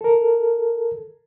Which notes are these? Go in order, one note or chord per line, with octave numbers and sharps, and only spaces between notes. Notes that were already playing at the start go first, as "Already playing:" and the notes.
A4 A#4